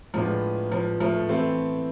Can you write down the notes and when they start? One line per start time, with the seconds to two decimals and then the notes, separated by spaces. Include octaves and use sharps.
0.14 A2 F3 G#3 B3 D4 F4
0.72 F3
1.00 F3 A3
1.29 E3 A3 B3 C4 E4